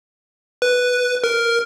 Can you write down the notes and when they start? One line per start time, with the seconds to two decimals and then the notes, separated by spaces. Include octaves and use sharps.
0.62 B4
1.24 A#4